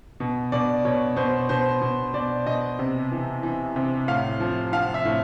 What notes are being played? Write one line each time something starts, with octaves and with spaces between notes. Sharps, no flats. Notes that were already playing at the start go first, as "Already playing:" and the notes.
B2
B2 D5
B2 C#5
B2 C5
B2 C5
B2
B2 D5
B2 D#5
C3
E3
E3
C3
A2 F5
F3
F3 F5
E5
A2